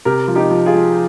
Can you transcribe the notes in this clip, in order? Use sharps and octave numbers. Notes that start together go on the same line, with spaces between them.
C3 G4 A#4
F3
D#4 G4
F3
F4 G#4
F3